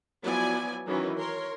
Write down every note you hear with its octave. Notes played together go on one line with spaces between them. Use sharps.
F3 F#3 B3 E4 D5 G#5
D#3 E3 F#3 C#4
A#4 C#5 C6